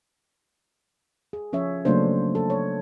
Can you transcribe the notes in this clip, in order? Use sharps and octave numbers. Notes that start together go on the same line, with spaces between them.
G#4
F3 C#4 C#5 E5
C#3 F#3 A3 A#3 D4 C5
A4
C#5